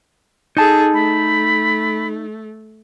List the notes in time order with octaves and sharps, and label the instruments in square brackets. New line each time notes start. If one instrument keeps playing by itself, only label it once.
[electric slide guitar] D#4 A5 [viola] G#4 A4
[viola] A3 [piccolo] B5